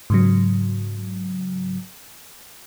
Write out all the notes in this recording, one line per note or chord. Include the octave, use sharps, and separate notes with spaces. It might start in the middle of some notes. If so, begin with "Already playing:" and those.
G#2 C#3 F#3